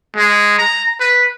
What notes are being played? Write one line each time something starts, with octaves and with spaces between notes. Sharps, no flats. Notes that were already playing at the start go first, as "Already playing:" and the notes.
G#3
A#5
B4